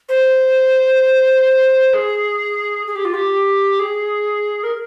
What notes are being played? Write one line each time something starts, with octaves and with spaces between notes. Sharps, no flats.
C5
G#4
G#4
G4
F4
G4
G#4
A#4